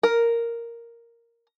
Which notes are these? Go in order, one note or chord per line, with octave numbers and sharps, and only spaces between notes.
A#4